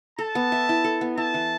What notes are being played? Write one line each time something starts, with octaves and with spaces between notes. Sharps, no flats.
A4 A5
B3
E5
E4
A4
B3
E4 A5
E3